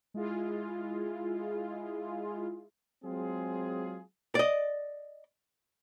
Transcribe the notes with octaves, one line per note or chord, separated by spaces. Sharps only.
G#3 E4 F4 G#4
F#3 G#3 C4 F4 G#4
D5 D#5